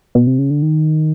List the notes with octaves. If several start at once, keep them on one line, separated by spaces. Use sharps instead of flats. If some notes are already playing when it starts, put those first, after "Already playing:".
B2
C3
C#3
D3
D#3